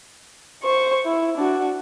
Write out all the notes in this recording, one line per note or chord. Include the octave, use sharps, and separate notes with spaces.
C5 C#6
E4
D4 F#4